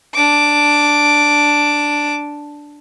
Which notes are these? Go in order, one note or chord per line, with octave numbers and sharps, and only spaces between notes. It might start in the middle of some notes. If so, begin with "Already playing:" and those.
D4 D6